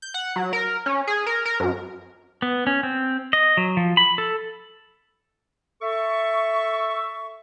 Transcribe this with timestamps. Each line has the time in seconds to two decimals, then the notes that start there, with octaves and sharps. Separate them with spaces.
0.02 G6
0.14 F#5
0.36 F#3
0.53 A#4
0.86 C#4
1.07 G#4
1.26 A#4
1.45 A#4
1.60 F#2
2.42 B3
2.67 C#4
2.83 C4
3.33 D#5
3.57 F#3
3.77 F3
3.97 B5
4.18 A4
5.82 A4 E5 C#6